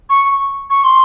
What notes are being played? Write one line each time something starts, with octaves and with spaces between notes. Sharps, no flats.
C#6
C#6
C6